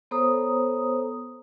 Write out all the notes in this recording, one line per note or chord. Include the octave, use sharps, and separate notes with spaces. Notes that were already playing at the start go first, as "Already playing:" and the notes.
B3 A4 C5 C#5 A#5 D#6